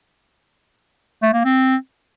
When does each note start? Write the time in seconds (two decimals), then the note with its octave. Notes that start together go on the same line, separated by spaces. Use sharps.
1.22 A3
1.33 A#3
1.45 C4